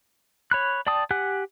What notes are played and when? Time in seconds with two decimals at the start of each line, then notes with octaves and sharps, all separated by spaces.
0.51 C#5 B5 F#6
0.87 D5 G5 A5 D#6
1.11 G4 F#5 G#5 F#6